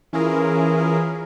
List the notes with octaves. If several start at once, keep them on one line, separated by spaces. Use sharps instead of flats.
E3 C#4 E4 F4 G#4 A#4